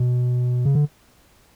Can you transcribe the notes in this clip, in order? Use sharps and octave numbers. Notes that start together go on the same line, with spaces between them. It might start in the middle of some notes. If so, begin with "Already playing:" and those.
Already playing: B2
C#3
D3